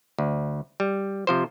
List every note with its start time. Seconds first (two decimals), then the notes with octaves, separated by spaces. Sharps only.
0.19 D2
0.80 G3
1.27 C3 F3 C5